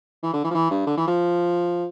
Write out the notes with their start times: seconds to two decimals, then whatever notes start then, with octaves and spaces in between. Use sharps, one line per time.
0.23 E3
0.33 D3
0.44 E3
0.51 F3
0.55 E3
0.71 G2
0.87 D3
0.97 E3
1.07 F3